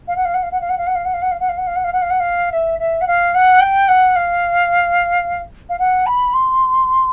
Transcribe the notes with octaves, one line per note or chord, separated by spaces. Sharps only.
F5
F#5
F5
F#5
F5
F#5
F5
F#5
F5
F#5
F5
F#5
F5
F#5
F5
F#5
F5
F#5
F5
F#5
F5
F#5
F5
F#5
F5
E5
E5
F#5
F5
F#5
G5
F#5
F5
F5
F#5
B5
C6